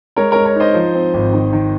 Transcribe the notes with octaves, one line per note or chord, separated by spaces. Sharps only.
G#3 A#4 C#5
G#3 A#4 C#5
A#4 C#5
D#4 C5 D#5
F3
C4
G#1
D#3
D#3